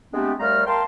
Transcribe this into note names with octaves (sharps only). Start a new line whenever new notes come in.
G#3 A3 B3 C4 D4 G4
D#2 G3 A3 F5 A#5 F6
A#4 F5 G5 A5 C6